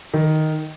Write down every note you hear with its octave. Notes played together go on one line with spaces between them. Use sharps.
D#3